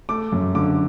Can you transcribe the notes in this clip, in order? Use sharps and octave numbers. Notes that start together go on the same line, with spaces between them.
A3 D6
F#2
D3 D6